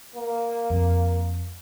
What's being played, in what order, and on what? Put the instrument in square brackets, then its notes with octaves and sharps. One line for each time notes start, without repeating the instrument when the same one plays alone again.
[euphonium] A#3
[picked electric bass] F2